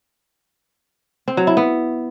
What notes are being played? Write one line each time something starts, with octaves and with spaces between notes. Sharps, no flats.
C4
F#3
E4
B3